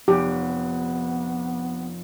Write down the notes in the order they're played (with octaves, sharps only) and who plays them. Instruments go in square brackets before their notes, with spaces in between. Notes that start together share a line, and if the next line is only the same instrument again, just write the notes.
[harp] F1 [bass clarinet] B3 [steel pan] G4